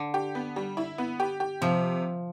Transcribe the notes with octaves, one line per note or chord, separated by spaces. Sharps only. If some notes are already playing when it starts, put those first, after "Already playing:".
Already playing: D3
G4
B3
G3
E4
B3
G4
G4
C3 F3